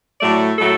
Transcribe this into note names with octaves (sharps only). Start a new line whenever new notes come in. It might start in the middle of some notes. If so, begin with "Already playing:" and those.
A2 F#3 A3 D5
A2 F#3 A3 A4